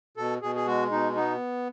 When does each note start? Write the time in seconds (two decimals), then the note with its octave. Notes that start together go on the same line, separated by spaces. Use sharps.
0.17 B2 A4
0.42 B2 G#4
0.56 G#4
0.67 G#3 F#4
0.91 B2 D#4
1.16 B3 D#4